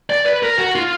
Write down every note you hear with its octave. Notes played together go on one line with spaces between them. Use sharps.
D5
B4
A#4
F#4
F4